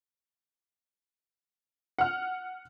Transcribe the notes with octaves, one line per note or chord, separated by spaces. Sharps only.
F#5 F6